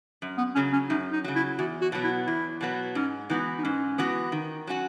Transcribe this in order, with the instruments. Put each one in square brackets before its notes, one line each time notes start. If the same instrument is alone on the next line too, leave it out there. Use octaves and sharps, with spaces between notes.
[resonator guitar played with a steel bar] F#2
[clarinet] B3
[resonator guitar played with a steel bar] C#3 F#3 [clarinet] C#4
[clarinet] C#4
[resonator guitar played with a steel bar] F#2 [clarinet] D#4
[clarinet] D#4
[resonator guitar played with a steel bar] C#3 F#3
[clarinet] E4
[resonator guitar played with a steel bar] E2 [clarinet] F#4
[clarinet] F#4
[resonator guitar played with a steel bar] B2 F#3 B3
[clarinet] E4
[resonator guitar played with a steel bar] E2 [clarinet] E4
[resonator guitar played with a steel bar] B2 F#3 B3
[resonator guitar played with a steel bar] G#2 [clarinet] C#4
[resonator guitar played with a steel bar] E3 B3 F#4 [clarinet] D#4
[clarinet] D#4
[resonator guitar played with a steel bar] G#2 [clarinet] C#4
[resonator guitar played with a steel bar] E3 B3 F#4
D#3
F#3 C#4 F#4